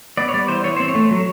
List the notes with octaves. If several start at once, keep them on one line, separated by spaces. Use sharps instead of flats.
B3 D5
C#5
G3 D5
E3 C5
E3 C#5
C4 C5
C#5
A3
F#3